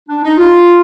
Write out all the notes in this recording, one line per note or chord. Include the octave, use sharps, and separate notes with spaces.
D4
D#4
F4